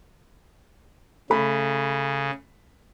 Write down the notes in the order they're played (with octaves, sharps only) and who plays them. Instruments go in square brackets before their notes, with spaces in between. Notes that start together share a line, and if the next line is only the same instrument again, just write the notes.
[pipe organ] C#3 [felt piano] A3 B5